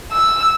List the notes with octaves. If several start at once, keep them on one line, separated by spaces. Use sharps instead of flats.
E6